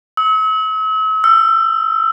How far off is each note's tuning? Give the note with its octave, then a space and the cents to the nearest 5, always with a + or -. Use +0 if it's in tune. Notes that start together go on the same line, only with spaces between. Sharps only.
E6 -45
E6 +25